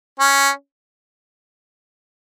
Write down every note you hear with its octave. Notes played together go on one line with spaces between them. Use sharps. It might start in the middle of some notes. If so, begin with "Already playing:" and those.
C#4